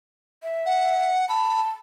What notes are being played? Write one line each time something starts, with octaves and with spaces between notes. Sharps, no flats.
E5
F#5
A5 B5